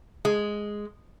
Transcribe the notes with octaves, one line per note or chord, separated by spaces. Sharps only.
G#3